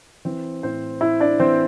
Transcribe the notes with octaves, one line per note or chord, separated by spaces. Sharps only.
E3 C4 C5
A2 C4 C5
A2 E4 E5
D4 D5
E3 C4 C5